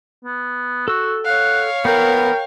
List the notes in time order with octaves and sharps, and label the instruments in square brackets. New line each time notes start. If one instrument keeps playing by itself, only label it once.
[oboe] B3
[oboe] F#4 [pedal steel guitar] A4 E6
[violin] C#5 F5 [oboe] F#5
[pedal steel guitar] B3 B4 [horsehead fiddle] A#4 [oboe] G5